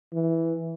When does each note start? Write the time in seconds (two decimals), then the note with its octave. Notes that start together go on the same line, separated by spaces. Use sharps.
0.14 E3